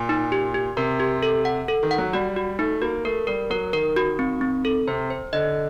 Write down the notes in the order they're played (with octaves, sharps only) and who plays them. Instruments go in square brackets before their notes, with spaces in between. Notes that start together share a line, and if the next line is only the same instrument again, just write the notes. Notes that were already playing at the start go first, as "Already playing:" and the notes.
Already playing: [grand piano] A#2
[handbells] D#4
G4
G4
[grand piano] C3 [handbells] A#4
[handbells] G4
A4
F#5
A4
[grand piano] D#3
[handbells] F#5
[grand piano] F#3
[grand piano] G3 [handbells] F#4
[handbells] F#4
[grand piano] A3 [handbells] D#4
[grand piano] A#3 [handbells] F#4
[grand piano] A3 [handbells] A#4
[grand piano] G3 [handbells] A#4
[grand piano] F#3 [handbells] A#4
[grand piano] D#3 [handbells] A#4
[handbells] F#4
C4
C4
A4
[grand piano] C3 [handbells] C5
[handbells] C5
[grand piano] D3 [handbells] D#5